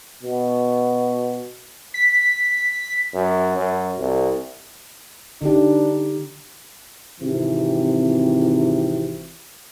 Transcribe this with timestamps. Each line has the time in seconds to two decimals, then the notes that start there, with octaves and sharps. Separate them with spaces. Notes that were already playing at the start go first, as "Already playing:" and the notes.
0.23 B2
1.94 B6
3.14 F#2
3.57 F#2
3.99 C2
5.42 D3 D4 D#4 G4
7.20 G#1 C3 E3 C4